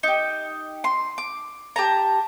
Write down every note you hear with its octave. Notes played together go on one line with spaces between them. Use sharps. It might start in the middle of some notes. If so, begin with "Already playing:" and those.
D#4 G4
C6
D6
G4 A5 A#5